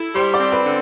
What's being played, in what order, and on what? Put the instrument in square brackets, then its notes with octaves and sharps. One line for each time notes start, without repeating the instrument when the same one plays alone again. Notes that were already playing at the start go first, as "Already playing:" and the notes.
Already playing: [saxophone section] E4 [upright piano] A4
[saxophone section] G3 [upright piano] C5 C6
[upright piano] D5 D6
[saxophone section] C4
[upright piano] B4 B5
[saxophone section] D3